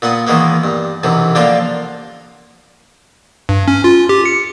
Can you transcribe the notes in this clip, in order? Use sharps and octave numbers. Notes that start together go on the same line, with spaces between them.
A#2 B3 F#5 D#6
D#3 E3 G#3 A#3 B3
G2
B1 F#2 C3 E3
D3 F3 A#3 D4 F4
G2
C#4
F4
G4
C#7